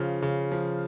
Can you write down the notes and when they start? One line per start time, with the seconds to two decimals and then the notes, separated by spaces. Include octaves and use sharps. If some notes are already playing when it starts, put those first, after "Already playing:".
Already playing: C#3 F3 F4
0.22 C#3
0.52 F3